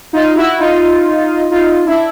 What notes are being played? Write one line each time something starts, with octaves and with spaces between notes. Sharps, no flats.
D#4 F4
E4 F#4
D#4 F4
D#4 F4
D4 E4